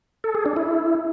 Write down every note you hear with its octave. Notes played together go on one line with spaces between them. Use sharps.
A4
G#4
D4
E4